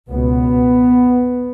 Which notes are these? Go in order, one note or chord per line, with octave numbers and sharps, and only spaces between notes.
C#2 B2 B3